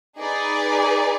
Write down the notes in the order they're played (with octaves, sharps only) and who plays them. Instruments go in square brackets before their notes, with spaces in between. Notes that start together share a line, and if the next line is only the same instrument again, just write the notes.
[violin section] D#4 G#4 B4 D5